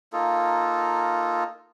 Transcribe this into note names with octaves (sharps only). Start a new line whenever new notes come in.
A#3 D#4 F4 A4